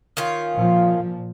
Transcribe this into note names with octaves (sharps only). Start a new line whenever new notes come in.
D#3 C#4 F4
A#2 F3